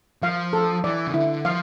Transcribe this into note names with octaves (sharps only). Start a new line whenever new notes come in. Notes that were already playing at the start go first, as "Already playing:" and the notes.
F3 F5
A4
E3 D5
C#3
D3 E4
F3 F5